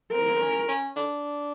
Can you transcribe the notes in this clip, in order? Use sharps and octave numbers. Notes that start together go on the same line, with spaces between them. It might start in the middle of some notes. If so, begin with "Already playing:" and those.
C4 A#4
C4
C#4
C#4
D4